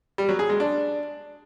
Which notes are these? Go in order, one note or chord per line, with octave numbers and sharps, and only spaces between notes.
G3
F#3
G#4
G#3
D4